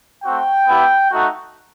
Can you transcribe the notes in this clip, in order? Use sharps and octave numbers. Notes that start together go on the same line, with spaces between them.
A3 C4 F#4 G5
B3 E4 G4
A3 D#4 F#4